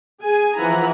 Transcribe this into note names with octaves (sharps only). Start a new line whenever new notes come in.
G#4 G#5
E3 F3 E4 F#5 A#5 B5